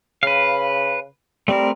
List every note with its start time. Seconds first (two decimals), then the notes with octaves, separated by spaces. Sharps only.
0.23 C#3 B4 F5
1.48 G3 A3 C4 A#4